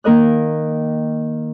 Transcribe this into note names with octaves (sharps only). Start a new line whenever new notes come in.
D#3 A#3 A#4 D#5 F#6